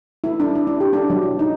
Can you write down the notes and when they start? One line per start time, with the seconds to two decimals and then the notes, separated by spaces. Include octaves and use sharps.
0.24 E4
0.40 D4
0.55 E4
0.67 D4
0.80 G4
0.93 D4
1.10 F#3
1.23 E4
1.39 D#4